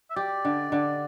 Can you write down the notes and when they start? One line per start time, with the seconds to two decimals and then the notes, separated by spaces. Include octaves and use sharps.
0.10 E5
0.16 G4 D5
0.45 D3
0.72 D3